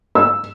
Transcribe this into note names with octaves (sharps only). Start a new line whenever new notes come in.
E6